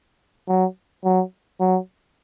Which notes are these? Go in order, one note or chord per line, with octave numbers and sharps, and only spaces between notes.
F#3
F#3
F#3